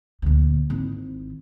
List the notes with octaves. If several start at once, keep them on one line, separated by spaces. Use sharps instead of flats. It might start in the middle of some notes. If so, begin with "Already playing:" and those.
D2 A#2
G#1 E4